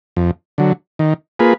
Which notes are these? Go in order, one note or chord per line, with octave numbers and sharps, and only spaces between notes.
F2
D3 F#3
D#3
A#3 F4 G#4 B4